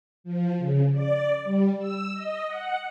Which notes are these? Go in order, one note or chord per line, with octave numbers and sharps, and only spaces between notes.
F3
C#3
D5
G3
E6
D#5
F#5